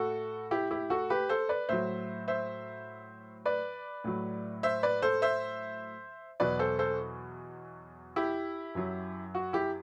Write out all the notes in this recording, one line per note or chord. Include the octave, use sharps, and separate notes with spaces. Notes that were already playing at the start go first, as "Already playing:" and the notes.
Already playing: A2 F#4 A4
E4 G4
E4 G4
F#4 A4
G4 B4
A4 C5
B4 D5
A2 F#3 C5 E5
C5 E5
B4 D5
A2 F#3
C5 E5
B4 D5
A4 C5
C5 E5
E2 B2 F#3 B4 D5
A4 C5
A4 C5
E4 G4
F#2 F#3
F#4
E4 G4